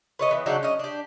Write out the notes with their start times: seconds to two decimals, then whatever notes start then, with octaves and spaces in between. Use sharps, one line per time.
0.19 B4 C#5 D#5
0.31 E3 B3
0.46 C#3 F#3 D4 D#4
0.63 C#4 D#5
0.79 D4 G4